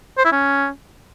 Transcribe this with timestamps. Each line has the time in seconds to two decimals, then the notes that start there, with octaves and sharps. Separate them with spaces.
0.18 C5
0.25 E4
0.32 C#4